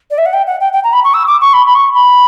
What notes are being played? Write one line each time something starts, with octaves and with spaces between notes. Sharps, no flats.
D5
E5
F#5
G5
F#5
G5
G5
A#5
B5
C#6
E6
D6
C#6
B5
B5
C#6
B5